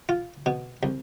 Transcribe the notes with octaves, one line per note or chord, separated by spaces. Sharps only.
F4
B2
C2